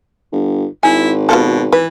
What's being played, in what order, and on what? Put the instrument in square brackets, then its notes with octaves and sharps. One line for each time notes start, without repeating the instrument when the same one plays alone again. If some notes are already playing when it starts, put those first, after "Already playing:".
[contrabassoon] G1
[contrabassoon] G#1 [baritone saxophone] E4 [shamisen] G#5
[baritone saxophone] B2 [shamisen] B3 F4 A4
[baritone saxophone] E3 [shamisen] B4